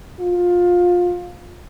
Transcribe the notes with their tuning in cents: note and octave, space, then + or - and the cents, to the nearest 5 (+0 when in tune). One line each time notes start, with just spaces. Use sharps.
F4 +20